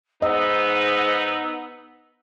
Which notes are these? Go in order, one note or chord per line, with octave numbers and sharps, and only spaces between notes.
G#2 B3 D#4 D#5 E6